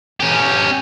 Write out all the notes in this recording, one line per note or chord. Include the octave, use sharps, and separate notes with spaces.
C#4 G4